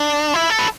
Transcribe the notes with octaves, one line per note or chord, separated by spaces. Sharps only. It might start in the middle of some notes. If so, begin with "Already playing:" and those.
Already playing: D4
E4
A4
B4